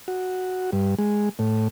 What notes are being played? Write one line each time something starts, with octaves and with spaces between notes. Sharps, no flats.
F#4
G2
G#3
A2